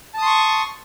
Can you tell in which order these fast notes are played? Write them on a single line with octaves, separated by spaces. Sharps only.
A5 D#6 C6 C#6